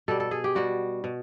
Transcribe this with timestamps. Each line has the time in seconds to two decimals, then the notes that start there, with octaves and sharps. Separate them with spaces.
0.08 B2 G3 A4
0.20 A4
0.31 G#4
0.44 G4
0.55 B2 G3 F#4
1.04 B2